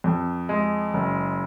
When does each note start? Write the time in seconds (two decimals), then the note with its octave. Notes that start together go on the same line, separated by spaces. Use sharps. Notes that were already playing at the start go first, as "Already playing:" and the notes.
0.04 F2
0.49 G#3
0.94 F#1